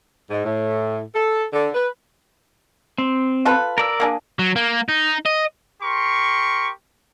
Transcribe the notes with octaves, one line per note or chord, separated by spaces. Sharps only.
G#2
A2
A4
D3
B4
C4
F4 A4 B4
A#4 D5 E6
A#3 D4 G#4
F#3
A#3
D#4
D#5
G4 A#4 C6 C#6